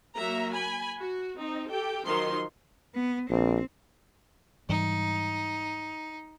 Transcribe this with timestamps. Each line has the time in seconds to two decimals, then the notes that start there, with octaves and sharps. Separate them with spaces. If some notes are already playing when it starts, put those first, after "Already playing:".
0.17 F#3 A#3 F#4 E5 A#5
0.52 G#5 B5
0.97 F#4
1.36 C4 D#4
1.71 G4 A4 G5
2.07 D#3 F3 F#3 D#4 C6
2.95 B3
3.30 A#1 C4
4.69 G#2 E3 G3 D#4